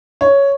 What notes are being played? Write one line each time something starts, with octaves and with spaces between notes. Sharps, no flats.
C#5